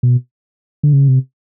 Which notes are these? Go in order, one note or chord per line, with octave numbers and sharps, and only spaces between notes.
B2
D3
C#3
C3